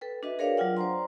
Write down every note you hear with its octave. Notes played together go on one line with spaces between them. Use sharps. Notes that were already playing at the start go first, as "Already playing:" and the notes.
A4 B4 G5
D4 F#4 B4 D#5 E5
G#4 A#4 B4 C#5 D5 F5
F#3 D4 F4 F#5 G5
C5 D5 G5 A#5 C6